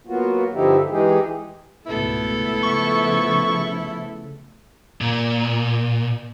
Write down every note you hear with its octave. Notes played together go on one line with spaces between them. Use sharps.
F#3 A#3 B3 F4 F#4
G2 D3 F3 D#4 E4 G4
E3 G#3 D#4 G4 G#4
C#2 G#2 B2 A3 B3 E4 A4
C#3 F3 C#6
A#2